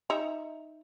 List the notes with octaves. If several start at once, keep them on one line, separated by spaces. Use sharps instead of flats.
D#4 E5 A#5